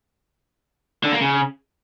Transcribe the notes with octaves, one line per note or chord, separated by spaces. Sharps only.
D3
A#3
C#3